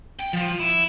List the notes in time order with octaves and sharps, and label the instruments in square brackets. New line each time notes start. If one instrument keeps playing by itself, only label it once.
[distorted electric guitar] G5
F3
E4